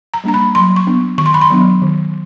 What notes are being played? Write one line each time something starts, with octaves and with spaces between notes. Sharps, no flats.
A#5
G3 A#3 D4 A#5
B5
F#3 C6
C#6
B3 D4
D#3 C#6
C6
B5
C6
F#3 B3 D4
D#3